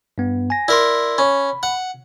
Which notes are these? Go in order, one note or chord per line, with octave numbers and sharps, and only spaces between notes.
G2 B3
G#5 A#6
E4 A#4 D5 C6
C#4 B5
F#5